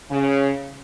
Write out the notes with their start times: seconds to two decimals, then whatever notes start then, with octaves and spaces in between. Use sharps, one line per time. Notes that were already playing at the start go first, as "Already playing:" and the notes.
0.10 C#3